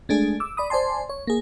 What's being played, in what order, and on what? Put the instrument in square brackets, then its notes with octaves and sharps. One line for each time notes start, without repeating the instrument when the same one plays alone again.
[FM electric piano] G#3 A3 D4 G#4
D6 E6
D5 B5 D#6
C5 D5 G#5 A5 C6
C#5
A#3 G#4